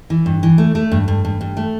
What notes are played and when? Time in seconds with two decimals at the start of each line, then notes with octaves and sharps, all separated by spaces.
0.10 E3
0.26 G2
0.43 E3
0.58 A3
0.75 A3
0.92 G2
1.08 G2
1.25 G2
1.41 G2
1.57 A3